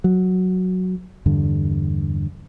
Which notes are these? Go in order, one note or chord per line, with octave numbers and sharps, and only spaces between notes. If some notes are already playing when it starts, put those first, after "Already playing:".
F#3
E2 G2 D3